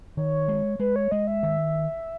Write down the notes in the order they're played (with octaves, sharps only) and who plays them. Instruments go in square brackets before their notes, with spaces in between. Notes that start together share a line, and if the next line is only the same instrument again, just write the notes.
[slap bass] D#3 [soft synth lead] C#5
[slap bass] G#3
[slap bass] G#3 [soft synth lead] B4
[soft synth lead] C#5
[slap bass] G#3 [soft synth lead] D#5
[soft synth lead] E5
[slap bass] D#3